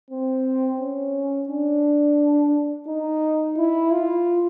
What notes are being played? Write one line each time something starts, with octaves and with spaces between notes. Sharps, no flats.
C4
C#4
D4
D#4
E4
F4